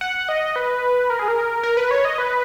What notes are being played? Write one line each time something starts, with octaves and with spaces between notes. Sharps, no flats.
F#5
D#5
B4
A#4
G#4
A#4
A#4
B4
C#5
D#5
B4